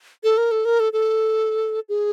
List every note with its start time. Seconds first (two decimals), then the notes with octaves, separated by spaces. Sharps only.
0.24 A4
0.38 A#4
0.51 A4
0.65 A#4
0.80 A4
0.93 A4
1.89 G#4